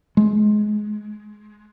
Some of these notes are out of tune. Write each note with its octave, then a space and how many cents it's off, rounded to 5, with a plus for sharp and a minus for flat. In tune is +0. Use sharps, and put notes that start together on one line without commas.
G#3 +20